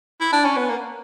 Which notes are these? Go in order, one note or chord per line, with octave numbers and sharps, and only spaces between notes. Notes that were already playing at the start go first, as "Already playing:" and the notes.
E4
D4
C#4
B3
A#3